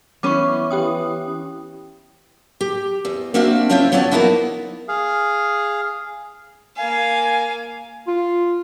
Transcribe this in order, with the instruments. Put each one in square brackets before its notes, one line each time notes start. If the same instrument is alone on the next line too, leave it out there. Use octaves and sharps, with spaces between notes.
[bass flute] E3 [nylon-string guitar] B3 C#4 B4 [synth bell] C#6 D6
[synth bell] G4 G5 D#6
[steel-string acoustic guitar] G4
E2
A#3 C4 D4 F#4 E5 F5
C#3 C4 E4 F4 C5 G5
F#3 B3 C#5 D5 F5 A5
F3 A#3 B3 D#4 E4 F#4
[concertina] G#4 F5
[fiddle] A#3 F5 [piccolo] G#5
[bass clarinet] F4